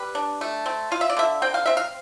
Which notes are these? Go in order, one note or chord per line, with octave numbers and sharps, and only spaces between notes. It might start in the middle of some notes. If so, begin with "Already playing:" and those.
Already playing: G3 B4
D4
A3
C4
F4 F5
E5
D5
D3 E5
C4 G5
F5
C4 E5
F5